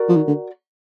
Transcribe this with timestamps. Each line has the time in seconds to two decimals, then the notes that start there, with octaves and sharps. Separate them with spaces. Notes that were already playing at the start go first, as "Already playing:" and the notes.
Already playing: F#4 A#4 D5
0.09 F3
0.16 D#3
0.28 D3